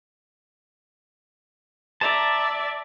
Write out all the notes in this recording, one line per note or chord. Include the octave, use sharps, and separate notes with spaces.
D5 E5 A5 A#5